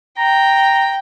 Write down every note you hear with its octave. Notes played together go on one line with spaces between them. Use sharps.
G5 A#5